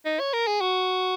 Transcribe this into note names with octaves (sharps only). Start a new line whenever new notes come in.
D#4
C#5
A#4
G#4
F#4